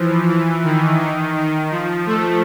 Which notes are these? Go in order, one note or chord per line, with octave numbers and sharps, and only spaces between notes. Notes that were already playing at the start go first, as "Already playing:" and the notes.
Already playing: E3 F3
E3
D#3
D#3
D#3
F3
A3